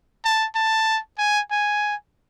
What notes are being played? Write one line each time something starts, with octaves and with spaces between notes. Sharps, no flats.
A5
A5
G#5
G#5